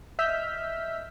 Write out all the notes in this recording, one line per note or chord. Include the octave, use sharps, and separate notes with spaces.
D#5 E5 E6 F6 G6 B6